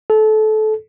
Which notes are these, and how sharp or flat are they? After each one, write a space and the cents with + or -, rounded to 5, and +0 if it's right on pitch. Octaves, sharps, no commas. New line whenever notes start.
A4 -25